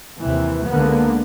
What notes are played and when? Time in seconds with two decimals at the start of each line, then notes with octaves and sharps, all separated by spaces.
0.20 D#2 C3 E3
0.67 C#2 D3 A#3 B3